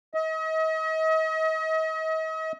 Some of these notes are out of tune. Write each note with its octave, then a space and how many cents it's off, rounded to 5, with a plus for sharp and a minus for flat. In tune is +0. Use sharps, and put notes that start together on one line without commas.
D#5 +40